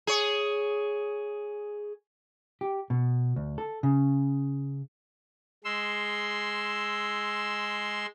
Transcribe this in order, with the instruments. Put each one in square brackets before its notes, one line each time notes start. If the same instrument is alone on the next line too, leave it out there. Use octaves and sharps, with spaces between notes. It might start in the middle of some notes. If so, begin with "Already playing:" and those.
[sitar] G#4 C#5
[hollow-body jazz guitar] G4
B2
D2
A4
C#3
[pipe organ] G#3 C6 E6